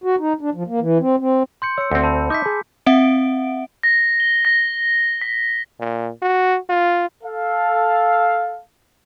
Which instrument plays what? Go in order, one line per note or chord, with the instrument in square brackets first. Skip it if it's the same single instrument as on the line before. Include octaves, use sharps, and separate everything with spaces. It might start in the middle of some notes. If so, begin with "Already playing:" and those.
[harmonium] F#4
D#4
D4
F3
A#3
E3
C4
C4
[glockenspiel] C6 G6 C#7
[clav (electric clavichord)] C#5 [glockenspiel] E6 C#7
[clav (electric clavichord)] D2 C4
[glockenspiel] A5 B5
[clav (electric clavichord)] D#4 E5 [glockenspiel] D6 G6 B6
[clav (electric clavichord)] G#4
[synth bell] C4 E5 F#5 D7
[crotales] A#6
G7
A#6
B6
[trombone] A#2
F#4
F4
[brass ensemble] A4 F5